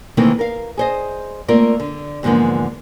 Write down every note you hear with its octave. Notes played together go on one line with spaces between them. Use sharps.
C3 D#3 E3 A3 A#3 C4
A#4 F5
G#4 C5 D#5
A3 A#3 C4 F4 A#4 D5
D3
E2 G#2 D3 F3 A#3